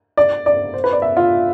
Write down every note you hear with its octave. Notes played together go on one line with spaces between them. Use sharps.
D5
D5
C5
B4
D5
E5
F4